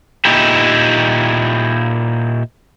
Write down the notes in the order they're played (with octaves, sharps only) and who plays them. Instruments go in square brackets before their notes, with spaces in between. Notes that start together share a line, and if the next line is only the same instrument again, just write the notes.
[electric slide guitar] A#2 D#4 E4 G4